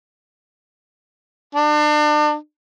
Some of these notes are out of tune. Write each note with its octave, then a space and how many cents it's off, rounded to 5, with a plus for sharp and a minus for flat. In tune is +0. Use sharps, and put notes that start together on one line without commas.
D4 +35